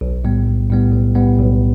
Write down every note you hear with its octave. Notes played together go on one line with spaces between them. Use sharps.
B1
A2 G3 B3
B1
A2 G3 B3
B1
A2 G3 B3
B1